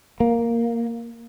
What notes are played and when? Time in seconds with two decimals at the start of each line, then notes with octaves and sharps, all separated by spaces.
0.20 A#3